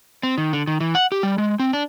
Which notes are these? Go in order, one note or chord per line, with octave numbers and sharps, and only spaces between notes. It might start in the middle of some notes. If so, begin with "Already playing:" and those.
C4
D#3
D3
D#3
E3
F#5
G4
G3
G#3
C4
D4